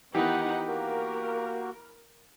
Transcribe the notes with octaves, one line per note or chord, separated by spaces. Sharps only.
D#3 E3 B3 D#4 G4 F#5
A#3 F#4 A#4